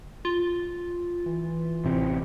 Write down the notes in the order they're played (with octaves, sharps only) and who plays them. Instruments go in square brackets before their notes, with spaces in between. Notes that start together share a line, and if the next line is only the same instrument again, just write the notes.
[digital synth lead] F4
[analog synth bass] E3
[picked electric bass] A1 C3